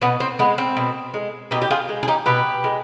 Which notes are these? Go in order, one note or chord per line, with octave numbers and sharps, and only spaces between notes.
B2 B3
C4
G#3 B3
C4
B2
G#3
B2 D#4 G4
G4
F4 G#4
G#3
G#4
D#4 G4
B2 G4 B4
G#3